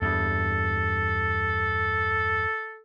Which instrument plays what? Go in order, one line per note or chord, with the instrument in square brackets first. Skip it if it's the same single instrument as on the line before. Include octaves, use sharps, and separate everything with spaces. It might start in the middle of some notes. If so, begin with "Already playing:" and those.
[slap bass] E2 G2 [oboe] A4